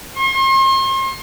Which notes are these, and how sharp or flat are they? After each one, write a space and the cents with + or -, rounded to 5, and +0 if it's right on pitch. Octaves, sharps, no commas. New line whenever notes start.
C6 +40